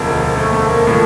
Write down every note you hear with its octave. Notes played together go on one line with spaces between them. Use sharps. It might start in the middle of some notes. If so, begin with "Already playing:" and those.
Already playing: E1 D2 C#3 F3 A#3
A3
A3
A#3
A2 F3